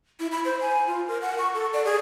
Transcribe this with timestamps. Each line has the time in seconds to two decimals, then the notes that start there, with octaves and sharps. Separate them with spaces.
0.20 E4
0.32 B5
0.45 C5
0.61 G#5
0.87 F4
1.08 A#4
1.21 F#5
1.38 C#6
1.54 A4
1.73 D5
1.85 G#4